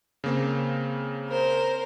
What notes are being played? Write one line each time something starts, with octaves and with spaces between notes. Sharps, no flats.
C#3 A#3 C4
A#4 C5